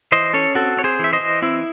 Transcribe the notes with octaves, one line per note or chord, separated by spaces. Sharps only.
E3 C5 D#5
C#4 A4 C#5
C4 F#4 A4
C4 C#5
G#4 C5
E3 E5
C5 D#5
E3
C4 E4